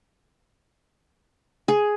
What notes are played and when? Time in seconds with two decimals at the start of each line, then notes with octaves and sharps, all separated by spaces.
1.68 G#4